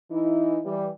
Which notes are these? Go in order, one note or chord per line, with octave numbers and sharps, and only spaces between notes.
E3 D#4 E4
E3 G3